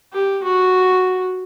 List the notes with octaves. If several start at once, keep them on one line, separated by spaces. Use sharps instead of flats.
G4
F#4